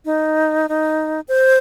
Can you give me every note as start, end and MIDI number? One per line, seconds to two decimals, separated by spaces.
0.05 0.67 63
0.69 1.20 63
1.28 1.58 72